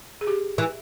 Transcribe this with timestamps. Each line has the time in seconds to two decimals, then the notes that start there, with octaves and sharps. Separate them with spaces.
0.21 G#4
0.27 G4
0.58 E3